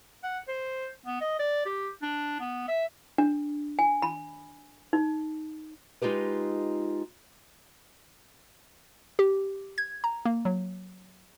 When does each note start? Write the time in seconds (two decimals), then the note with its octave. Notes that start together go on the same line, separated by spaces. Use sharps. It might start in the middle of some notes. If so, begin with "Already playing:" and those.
0.24 F#5
0.48 C5
1.06 B3
1.21 D#5
1.39 D5
1.66 G4
2.02 D4
2.40 B3
2.68 E5
3.18 D4
3.79 G#5
4.02 B5
4.93 D#4
6.02 G#3 D#4 F4 G4 B4
9.19 G4
9.78 G#6
10.04 A#5
10.25 A#3
10.45 F#3